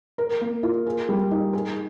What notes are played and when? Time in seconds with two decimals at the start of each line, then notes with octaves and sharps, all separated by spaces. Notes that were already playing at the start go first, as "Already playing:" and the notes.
0.18 A#4
0.41 A#3
0.63 F4
0.86 G#4
1.09 G3
1.31 D#4
1.53 G#4